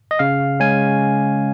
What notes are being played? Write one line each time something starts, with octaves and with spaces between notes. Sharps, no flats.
D#5
C#3 F5
G#3 C#4 G#5